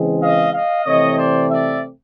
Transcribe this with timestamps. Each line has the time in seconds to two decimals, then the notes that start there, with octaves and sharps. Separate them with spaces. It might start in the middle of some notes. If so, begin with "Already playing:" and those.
Already playing: C#3 E3 G#3 C4
0.21 D#5 F5
0.54 D#5 F5
0.85 C3 E3 A3 C4 C#5 D#5
1.18 C5 D5
1.50 D5 E5